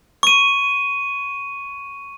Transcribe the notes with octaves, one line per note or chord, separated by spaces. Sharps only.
C#6 D#7